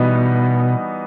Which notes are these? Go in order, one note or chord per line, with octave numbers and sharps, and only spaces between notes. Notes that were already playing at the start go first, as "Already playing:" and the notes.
Already playing: B2 E3 G3 B3 D#4 F#4